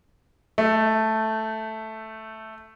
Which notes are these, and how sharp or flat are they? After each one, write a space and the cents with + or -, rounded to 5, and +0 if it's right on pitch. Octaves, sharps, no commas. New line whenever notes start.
A3 +0